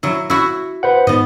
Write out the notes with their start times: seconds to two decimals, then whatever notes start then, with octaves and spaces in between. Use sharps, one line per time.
0.03 F#3 E4
0.30 E4 F#4
0.83 B4 C5 F#5
1.07 G#2 B3 D#5